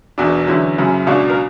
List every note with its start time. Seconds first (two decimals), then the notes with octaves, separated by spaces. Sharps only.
0.18 E1 E2 B2 D4 F#4
0.47 E2 D3 F#3 C#4 E4
0.78 F#1 F#2 C#3 F#3
1.07 C#2 B2 F#3 D4 F#4
1.30 A#4